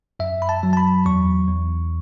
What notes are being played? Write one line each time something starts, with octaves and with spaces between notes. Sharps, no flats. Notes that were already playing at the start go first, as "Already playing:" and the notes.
F#2 E5
B5
A5
F#3
A5
B5
E2 C#6
E2